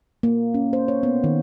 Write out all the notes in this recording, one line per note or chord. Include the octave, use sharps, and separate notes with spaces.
A#3
C#4
C5
C#5
B3
D#3